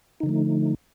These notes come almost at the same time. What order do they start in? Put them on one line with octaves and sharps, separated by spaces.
D#4 D3 F3 A3